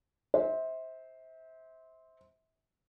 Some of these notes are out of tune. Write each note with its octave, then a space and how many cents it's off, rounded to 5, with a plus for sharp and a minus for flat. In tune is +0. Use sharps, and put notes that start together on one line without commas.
C5 +0 E5 -30